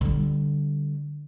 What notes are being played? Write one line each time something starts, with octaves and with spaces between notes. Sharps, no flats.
D3 G3